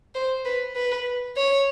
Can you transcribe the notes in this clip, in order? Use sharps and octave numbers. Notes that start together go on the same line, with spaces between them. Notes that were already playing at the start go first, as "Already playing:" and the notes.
C5
B4
B4
C#5